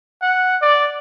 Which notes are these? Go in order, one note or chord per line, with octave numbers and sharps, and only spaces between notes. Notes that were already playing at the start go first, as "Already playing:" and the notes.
F#5
D5